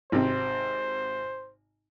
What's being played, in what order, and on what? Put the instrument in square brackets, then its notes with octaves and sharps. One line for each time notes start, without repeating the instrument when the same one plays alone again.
[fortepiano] G#1 C3 [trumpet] C5